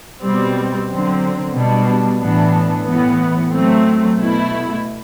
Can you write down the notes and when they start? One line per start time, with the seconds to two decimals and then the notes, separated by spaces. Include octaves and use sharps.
0.23 B2 G3 C4
0.89 D3 F#3 C4
1.55 B2 G3 D4
2.21 A2 E3 B3 D4
2.87 A2 E3 B3
3.53 F#3 A3 C4
4.19 B2 A3 E4